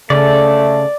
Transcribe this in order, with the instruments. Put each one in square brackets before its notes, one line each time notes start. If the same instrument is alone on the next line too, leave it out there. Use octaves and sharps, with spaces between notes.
[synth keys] C#3 [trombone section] A3 [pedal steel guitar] D5